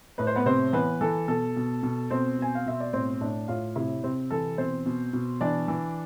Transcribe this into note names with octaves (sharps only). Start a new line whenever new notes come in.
A2 B4
C5
B3 B4
C3 C4 C5
E3 B3 B4
E3 A4
B2 A4
B2
B2
B2 C4 C5
B2 G#5
F5
B2 E5
D5
A2 C4 C5
A2 D4 D5
A2 F4 F5
C3 E4 E5
C3 C4 C5
E3 A4
B2 C4 C5
B2
B2
E3 D4 D5
E3